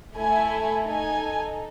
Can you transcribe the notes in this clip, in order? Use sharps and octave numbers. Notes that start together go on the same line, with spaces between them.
A3 E4 A4 G#5
D#4 A4 G#5